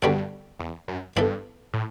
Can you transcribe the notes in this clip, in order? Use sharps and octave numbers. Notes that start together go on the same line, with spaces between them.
G2 D3 G3 B3 F#4 A4
E2
F#2
G2 E3 B3 E4 A4
A2